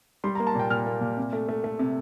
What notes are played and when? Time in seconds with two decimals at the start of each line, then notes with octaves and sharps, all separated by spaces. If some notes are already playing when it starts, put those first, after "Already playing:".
0.24 G3 C6
0.35 A#5
0.40 A#3
0.47 A5
0.55 A#2 G5
0.70 A#2 F6
0.86 A#3
1.01 A#2
1.17 C3
1.33 A3
1.48 A3
1.64 A3
1.79 C3